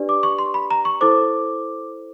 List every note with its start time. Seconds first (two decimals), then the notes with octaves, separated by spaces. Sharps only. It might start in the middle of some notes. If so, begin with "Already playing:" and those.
Already playing: D4 G4 B4 D5
0.09 D6
0.23 C#6
0.39 C6
0.54 B5
0.71 A#5
0.85 C#6
1.01 E4 A4 C5 D6